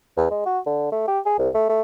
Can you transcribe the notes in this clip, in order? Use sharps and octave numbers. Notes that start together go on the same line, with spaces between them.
E2
G#3
F#4
D3
A3
G4
G#4
C2
A3
A3